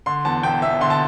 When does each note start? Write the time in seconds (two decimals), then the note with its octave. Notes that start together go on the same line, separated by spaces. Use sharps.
0.06 D3 C6
0.25 E2 A5
0.43 E1 G5
0.62 E1 E5
0.81 D3 C6
0.90 A5